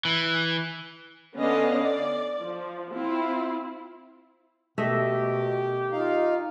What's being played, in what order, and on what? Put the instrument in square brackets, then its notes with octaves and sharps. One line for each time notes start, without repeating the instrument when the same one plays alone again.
[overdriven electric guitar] E3
[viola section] D3 B3 C#4 D5 D#5 F5
D5
F3
C4 E4 F4
[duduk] B2 [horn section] D#3 G4 [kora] A3 D#5 E5
[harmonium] D#4 F5 [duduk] F4